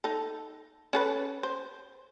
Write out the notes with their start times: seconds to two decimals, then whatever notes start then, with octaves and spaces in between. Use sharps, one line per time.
0.04 D#4 A4
0.93 C#4 A4 B4
1.43 C5